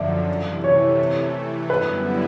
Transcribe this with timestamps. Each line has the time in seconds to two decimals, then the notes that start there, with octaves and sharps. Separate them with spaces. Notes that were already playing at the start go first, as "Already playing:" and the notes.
Already playing: F#2 D3 F3 D5 E5
0.29 C3 E3 A3
0.64 C#5
1.70 F#2 D3 G3 B3 E4 B4